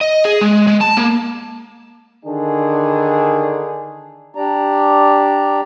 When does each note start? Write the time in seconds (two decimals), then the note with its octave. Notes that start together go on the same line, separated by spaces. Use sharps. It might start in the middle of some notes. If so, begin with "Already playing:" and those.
0.01 D#5
0.25 G#4
0.41 G#3
0.67 G#3
0.81 A5
0.97 A#3
2.25 D3 D#3 D4 G#4
4.35 D4 G4 D5 A#5